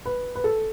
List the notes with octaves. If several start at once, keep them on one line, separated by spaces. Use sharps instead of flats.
B4
B4
A4